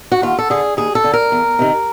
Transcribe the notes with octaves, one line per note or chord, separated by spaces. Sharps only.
F#4
D#2 F4
A4
D3 G#4
D#2 G#4
A4
D3
A#4
E2
C3 D#3